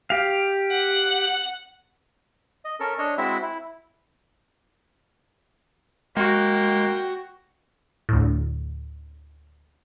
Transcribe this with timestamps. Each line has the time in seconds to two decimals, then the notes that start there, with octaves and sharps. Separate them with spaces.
0.10 G4 F5
0.72 F#5
2.65 D#5
2.80 C#4 A4 A#4
2.98 D4 C#5 D#5
3.18 G#3 C4 E4 F#4 E5
3.42 E4
6.17 G#3 A#3 F#4 G5
8.09 D2 A2